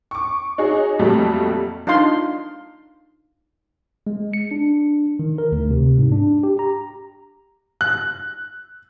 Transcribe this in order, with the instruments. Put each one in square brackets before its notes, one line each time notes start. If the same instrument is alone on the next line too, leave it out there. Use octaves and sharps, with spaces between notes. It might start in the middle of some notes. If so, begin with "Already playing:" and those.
[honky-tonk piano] C#6 D6
D#4 F#4 G#4 C#5
F2 A#2 F#3 G3 A3
[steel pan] D4 D#4 F4 F5 C6
[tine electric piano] G#3
C#7
D4
D#3
A#4
D2
C3
G#2
D4
G4
A#5
[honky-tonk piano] F#6